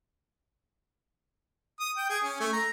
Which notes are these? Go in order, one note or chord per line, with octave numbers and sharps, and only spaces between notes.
D#6
G5
G#4
C#4
A3
A#5